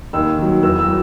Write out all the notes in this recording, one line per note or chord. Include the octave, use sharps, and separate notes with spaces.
D#2 E6
D#3 F#3
E2 E6
E6
F#3